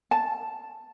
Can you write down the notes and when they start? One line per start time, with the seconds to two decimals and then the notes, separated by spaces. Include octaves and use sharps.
0.11 A5